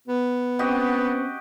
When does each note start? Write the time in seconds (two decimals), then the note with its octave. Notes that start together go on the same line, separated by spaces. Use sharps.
0.08 B3
0.59 C4 C#4 F#4 G4 C5 D#5